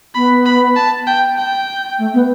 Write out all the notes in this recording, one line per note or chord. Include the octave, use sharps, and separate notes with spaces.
B3 B5
B5
A5
G5
G5
A3
B3